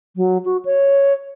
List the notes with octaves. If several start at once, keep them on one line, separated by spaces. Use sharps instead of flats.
F#3
F#4
C#5